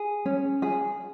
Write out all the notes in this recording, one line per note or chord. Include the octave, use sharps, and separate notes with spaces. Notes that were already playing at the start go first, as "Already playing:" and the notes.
Already playing: G#4
C#4
G#4